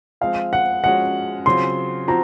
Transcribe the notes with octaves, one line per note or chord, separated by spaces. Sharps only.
F3 G#3 C4 F5
F#5
F3 G#3 C#4 F#4 F#5
C#3 F#3 C4 F4 C6
F3 C4 F#4 A#5